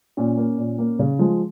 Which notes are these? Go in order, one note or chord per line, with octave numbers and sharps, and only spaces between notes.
A#2 C#4
A#3
A#2
A#3
C#3
F3 G#3